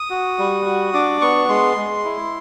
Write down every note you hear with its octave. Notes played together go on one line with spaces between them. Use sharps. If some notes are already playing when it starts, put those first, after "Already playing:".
Already playing: D#6
F#4
G3
F#4
D4 D6
B3 C#6
G#3 C6
G#3
E4